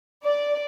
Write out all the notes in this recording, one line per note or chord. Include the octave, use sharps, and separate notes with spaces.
D5